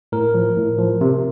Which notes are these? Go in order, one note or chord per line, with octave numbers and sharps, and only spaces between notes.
A2 A#4
F3
A2
F3
C3